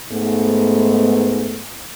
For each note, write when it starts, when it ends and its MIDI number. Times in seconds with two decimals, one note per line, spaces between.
0.11 1.62 44
0.11 1.62 57
0.11 1.62 59